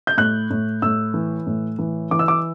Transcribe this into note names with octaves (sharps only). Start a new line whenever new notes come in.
G6
A2 F#6
A2
A2 E6
E3
A2
E3
E3 D6
E6
D6